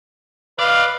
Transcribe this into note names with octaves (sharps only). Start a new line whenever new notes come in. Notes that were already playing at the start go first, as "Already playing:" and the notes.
B4 D5 D#5 F5